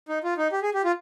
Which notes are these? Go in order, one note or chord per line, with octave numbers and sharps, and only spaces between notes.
D#4
F4
D#4
G4
G#4
G4
F4